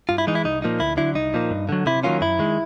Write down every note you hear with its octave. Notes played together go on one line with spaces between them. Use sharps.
G2 F4
E4
E3 G#3 D#4
E4
C2 D#4
A#2 F3 A#3 D#4
D2 E4
D3 F#3 E4
C2 D#4
A#2 F3 A#3
G2
D3 F#3
C3 E4
D#3 F#3 A#3 C#4 F4
F#2 E4
D#3 G#3